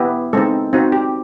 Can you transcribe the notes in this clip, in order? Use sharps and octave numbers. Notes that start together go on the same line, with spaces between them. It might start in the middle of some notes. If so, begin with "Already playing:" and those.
Already playing: B3 E4 G4
G#3 C4 D#4 A4
C4 D#4 F#4
G4